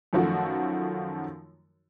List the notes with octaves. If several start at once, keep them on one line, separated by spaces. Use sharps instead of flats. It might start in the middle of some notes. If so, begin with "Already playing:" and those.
F#2 D#3 F3 A3 F#4